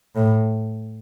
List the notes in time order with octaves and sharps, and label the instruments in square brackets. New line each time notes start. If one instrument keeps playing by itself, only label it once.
[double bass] A2